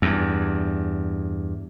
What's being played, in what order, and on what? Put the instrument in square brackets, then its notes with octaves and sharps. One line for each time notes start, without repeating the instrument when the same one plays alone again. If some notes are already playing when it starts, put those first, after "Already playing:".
[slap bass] E2 G2